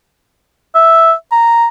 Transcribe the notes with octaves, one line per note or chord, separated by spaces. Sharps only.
E5
A#5